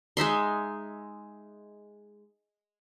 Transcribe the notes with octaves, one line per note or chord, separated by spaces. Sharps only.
G#3 D#4 E5 C6